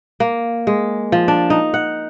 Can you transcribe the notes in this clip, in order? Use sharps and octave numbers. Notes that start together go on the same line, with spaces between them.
A#3
G#3
F3
D4
D#4
F#5